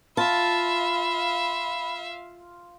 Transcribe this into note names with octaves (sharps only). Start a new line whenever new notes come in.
F4 E5 F5 A5 B5